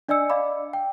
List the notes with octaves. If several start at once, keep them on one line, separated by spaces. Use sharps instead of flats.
D4 D5 D#5 G#5 E6 C#7
D5 D#5 F5 B5 D6
G5